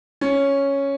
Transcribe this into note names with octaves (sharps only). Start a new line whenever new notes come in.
C#4